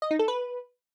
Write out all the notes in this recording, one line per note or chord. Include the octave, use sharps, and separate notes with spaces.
D#5
D#4
A4
B4